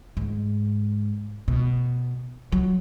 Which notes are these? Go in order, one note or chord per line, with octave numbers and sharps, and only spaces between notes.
G#2
B2
F#3